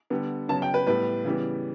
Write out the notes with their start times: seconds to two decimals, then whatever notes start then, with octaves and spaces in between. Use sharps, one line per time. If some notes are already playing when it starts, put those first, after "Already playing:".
0.10 D3 G3 B3
0.49 C#3 F#3 B3 A5
0.62 G5
0.74 B4
0.87 A2 G3 B3 B4
1.25 C#3 E3 G3 B3